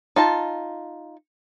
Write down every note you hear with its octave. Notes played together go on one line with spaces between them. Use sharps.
D#4 F4 A5